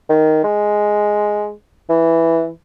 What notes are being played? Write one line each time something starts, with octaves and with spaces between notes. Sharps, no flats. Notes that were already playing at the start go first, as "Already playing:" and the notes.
D#3
G#3
E3